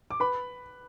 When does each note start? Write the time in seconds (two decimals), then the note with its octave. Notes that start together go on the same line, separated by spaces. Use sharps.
0.11 D6
0.20 B4 B5